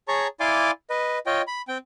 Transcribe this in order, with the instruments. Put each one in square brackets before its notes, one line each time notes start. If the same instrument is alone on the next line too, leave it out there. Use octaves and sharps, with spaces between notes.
[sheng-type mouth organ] G#4 C#5 A5 A#5 C#6
E4 D5 F5 G#5 C6 D6
B4 D#5
F4 C#5 D#5 G5
B5
C4 G5